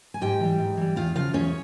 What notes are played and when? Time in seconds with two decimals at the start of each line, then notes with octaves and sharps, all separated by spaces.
0.14 G#5
0.21 G#2 G4 G5
0.40 E3 G3
0.58 G#2
0.77 E3 G3
0.96 E2 F4 F5
1.15 C#3 F3 F4 F5
1.34 E2 C#4 C#5